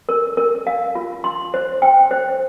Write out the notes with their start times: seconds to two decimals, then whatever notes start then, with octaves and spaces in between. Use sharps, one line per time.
0.09 A#4
0.37 A#4
0.67 F5
0.95 F4
1.24 C6
1.54 C5
1.82 G5
2.11 C5